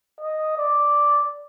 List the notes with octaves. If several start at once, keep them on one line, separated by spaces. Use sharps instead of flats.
D#5
D5